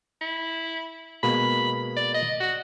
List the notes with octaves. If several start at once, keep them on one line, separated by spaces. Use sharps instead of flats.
E4
B2 G#3 A#3 B5
D5
D#5
F#4